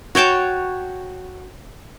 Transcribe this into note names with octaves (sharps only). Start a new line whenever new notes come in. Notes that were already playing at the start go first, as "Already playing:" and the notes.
F#4 C#5 G5 A5